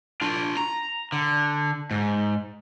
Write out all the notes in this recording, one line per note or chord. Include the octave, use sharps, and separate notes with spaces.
D4 F4
A#5
D3
G#2